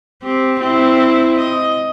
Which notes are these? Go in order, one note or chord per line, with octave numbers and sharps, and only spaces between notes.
C4 G4
C4 E4
D#5